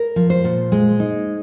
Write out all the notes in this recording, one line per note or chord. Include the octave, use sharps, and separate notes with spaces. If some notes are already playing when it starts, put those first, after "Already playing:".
Already playing: A#4
F3
C5
A#2
G#3
D#4